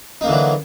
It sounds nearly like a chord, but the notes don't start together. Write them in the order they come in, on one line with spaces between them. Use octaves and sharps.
D#4 A#3 D3 E3 F#3